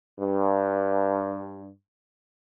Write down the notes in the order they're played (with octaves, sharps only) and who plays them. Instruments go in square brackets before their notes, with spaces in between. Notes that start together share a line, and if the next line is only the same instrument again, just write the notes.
[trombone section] G2